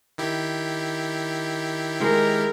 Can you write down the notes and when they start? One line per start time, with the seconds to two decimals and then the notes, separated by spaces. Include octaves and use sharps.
0.18 D#3 E4 G4
2.01 G#3 A#4